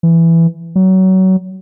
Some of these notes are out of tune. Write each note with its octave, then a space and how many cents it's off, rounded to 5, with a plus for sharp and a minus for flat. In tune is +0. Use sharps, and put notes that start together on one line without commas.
E3 +10
F#3 +25